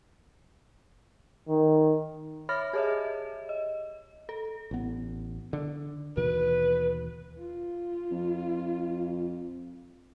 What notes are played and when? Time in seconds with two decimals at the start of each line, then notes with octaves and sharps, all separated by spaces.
1.49 D#3
2.49 C#5 E5 B5 F6 A6 A#6
2.73 G4 G#4 C#5 D#5 E5
3.49 D#5
4.29 A4
4.71 A1 B3
5.53 D3
6.17 D#2 B2 E3 B4
7.39 F4
8.11 F2